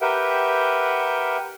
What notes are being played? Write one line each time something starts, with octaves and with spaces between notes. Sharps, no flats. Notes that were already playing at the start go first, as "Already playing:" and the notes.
G4 A#4 B4 E5 F#5 G5